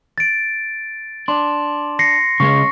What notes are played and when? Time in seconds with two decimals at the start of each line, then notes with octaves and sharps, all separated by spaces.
0.18 A6 D7
1.28 D4 C6
1.99 A#6 C7 C#7
2.40 C#3 G#3 C#4 C#6